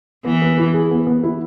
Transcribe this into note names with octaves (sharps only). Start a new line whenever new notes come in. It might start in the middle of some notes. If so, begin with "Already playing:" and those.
E3 B3
B3
E4
G#4
B3
B3
E4